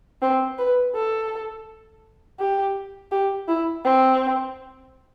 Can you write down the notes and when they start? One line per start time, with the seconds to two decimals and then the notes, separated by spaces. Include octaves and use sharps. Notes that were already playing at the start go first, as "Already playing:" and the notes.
0.22 C4
0.58 B4
0.95 A4
2.40 G4
3.12 G4
3.48 E4
3.85 C4